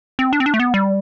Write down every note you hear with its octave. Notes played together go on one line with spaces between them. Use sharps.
C4
D4
C4
D4
A3
B3
G3